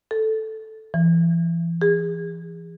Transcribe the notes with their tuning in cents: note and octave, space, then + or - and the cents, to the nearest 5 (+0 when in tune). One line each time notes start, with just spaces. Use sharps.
A4 -5
E3 +35
G#4 -25